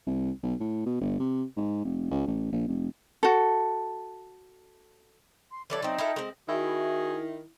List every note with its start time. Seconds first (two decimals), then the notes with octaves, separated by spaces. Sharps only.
0.07 C2
0.43 B1
0.60 A2
0.86 B2
1.01 G1
1.19 C3
1.57 G#2
1.84 F1
2.11 C#2
2.27 A1
2.52 A#1
2.68 F1
3.23 F#4 A4
5.49 C6
5.70 E3 G3 A4 C#5 D5
5.82 F#3 C4 D#4 G5
5.98 E4 F4 A4
6.16 G#3 C4
6.49 D#3 E4 F#4 G#4